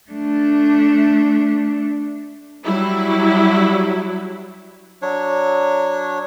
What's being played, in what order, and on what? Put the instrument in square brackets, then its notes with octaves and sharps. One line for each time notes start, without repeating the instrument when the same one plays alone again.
[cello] A3 D4
[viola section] F#3 G3 E4
[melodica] F#3 D4 C#5